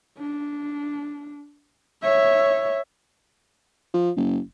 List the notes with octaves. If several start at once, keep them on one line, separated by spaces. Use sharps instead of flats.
D4
C#5 E5
F3
F#1